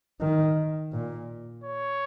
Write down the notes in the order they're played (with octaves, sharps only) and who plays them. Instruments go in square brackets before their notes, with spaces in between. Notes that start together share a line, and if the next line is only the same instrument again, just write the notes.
[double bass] D#3
A#2
[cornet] C#5